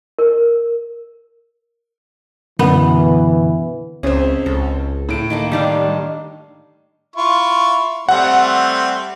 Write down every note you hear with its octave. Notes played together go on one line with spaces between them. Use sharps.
A#4
F#2 B2 D3 E3 B3
C#2 C4 C#4 G#4 E5
C#2 A4
A2 D7
D#3 A#3 A4
D#3 G3 D4 F5
E4 F4 C#6
G3 A3 C4 F#5